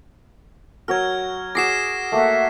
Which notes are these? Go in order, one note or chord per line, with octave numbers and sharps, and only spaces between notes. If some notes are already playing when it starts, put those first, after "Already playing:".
F#3 F#4 A#4 F6 G#6
F#4 G#4 D6 A#6 C7 E7
A3 A#3 E5 F#5